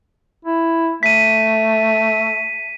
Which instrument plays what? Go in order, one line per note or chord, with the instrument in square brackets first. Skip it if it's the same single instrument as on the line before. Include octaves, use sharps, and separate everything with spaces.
[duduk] E4
[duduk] A3 [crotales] B6 D#7